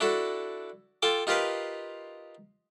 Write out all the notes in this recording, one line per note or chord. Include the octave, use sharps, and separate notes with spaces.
D4 E4 F#4 A4
F4 A4 G5 D6
D#4 F4 G4 A#4 B4 F5